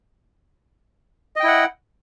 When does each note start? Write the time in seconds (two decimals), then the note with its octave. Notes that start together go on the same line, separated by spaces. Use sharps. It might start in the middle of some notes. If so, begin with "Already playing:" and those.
1.36 D#5
1.40 G5
1.44 E4
1.48 F#5